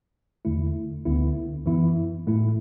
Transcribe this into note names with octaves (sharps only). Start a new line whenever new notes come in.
E2 D3 A3 E4
D2 D3 B3 E4
F#2 E3 B3 E4
A2 A3 E4